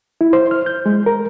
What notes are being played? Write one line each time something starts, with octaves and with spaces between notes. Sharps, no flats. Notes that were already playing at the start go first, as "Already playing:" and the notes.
E4
C5
F6
G6
G#3
A#4